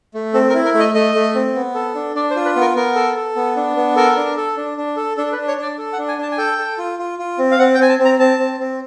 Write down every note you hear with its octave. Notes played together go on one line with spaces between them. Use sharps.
A3
C4 A4
A#4
E4
A#4
A3
D#5
A3 D#5
A3
C4
B3
A4
D4
D4 D5
C5
F4
B4
B3
A#4
B3 A#4
A4
A4
B3
D4
B3
A4 A#4
D4
A4
D4
D4
A4
D4 A4
B4
D4
C#5
D4 D5
A4
F#5
D4
G#5
D4 A5
G#5
A4 G5
A4
F4
F4
F4
C4
F5
C4 F#5
G5
C4 G#5
A5
C4
A#5
C4 A5
C4
C4